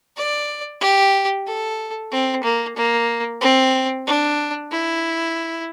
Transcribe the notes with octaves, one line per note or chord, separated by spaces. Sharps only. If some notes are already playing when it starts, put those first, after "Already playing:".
D5
G4
A4
C4
A#3
A#3
C4
D4
E4